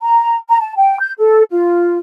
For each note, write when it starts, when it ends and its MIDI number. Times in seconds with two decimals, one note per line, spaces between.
0.02 0.35 82
0.49 0.60 82
0.60 0.74 81
0.77 0.98 79
1.00 1.13 91
1.18 1.42 69
1.51 1.98 65